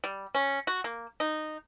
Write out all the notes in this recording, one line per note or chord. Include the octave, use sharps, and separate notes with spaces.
G3
C#4
F#4
A#3
D#4